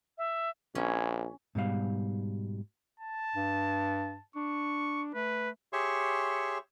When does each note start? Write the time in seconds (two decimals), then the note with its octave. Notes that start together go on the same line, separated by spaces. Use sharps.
0.18 E5
0.75 A#1 C#4
1.55 G#2 B2 G3 F5
3.00 A5
3.36 G2
4.36 D4 C#6
5.15 A3 B4
5.73 G4 G#4 C#5 E5 C6 C#6